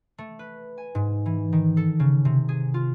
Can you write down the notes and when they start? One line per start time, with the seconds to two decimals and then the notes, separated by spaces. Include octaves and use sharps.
0.18 A3
0.39 B4
0.78 G#5
0.95 G#2
1.26 E3
1.52 D#3
1.77 A4
2.00 C#3
2.25 C3
2.49 G#4
2.74 F4